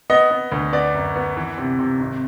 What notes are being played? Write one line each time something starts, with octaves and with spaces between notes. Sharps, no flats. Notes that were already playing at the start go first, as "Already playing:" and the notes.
B3 D#5
B3
D2
B3 D5
F#2
B3
E3
C3
C3
G#1